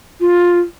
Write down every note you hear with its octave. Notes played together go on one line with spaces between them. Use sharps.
F4